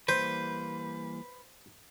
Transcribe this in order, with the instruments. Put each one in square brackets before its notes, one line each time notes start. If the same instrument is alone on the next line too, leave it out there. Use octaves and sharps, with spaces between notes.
[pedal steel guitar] E3 G3 A#3 [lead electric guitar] B4 [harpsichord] C5